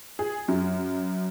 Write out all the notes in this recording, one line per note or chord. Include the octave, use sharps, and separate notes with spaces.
G#4
F#2